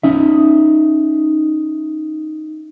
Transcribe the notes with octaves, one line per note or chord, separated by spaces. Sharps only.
C#4 D#4 E5